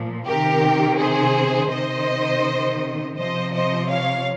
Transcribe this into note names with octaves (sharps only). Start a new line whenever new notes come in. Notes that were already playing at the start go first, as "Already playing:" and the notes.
Already playing: A#2 F3
C3 D#3 G4 A#4
G#4 C5
C3 D#3 C5 D#5
C3 F3 C5 D#5
C5 D#5
C#5 F5